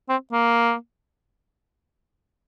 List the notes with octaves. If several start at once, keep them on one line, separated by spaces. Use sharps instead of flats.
C4
A#3